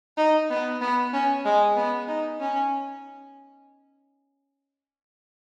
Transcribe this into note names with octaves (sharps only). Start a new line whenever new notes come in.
D#4
B3
B3
C#4
G#3
B3
D#4
C#4